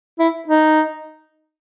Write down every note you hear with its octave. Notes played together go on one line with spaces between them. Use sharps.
E4
D#4